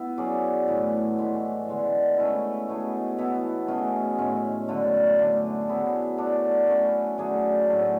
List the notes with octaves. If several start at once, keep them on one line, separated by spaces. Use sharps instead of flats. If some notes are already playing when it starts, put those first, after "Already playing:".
Already playing: B3 E4
F#3 C#4 G#4 D5
A2 E3 A3
A2 E3 G#3
D3 G#3 B3
A3 C#4 E4
B2 A3 E4 G#4
E3 B3 E4 A4
B2 A3 C#4 G#4
A2 G#3 C#4
F#2 D3 A3
D3 A3 D4
F#3 B3 E4 G#4
A3 D4 A4 D5
A3 C#4 F#4 B4
F#3 A3 D4 G#4
A2 F#3 A3